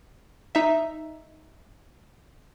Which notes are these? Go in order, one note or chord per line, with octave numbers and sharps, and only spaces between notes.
D#4 E5